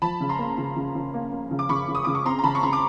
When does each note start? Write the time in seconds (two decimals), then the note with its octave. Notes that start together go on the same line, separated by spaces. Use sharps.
0.02 F3 A5 B5
0.20 C#3
0.29 A#5 C6
0.39 A#3
0.58 C#3
0.76 C#3
0.95 C#3
1.14 A#3
1.32 A#3
1.51 C#3
1.59 D6
1.69 C#3 B5 C#6
1.88 C#3
1.95 D#6
2.05 C#3 D6
2.15 C#6
2.25 C4 A#5 C6
2.39 A#5
2.44 C#3 A5 B5
2.55 C#6
2.63 C#3 A#5 C6
2.73 D6